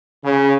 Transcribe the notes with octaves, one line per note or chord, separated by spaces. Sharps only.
C#3